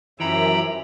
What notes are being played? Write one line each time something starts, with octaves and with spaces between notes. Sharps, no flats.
F#2 E3 F3 E5 G5 A#5 B5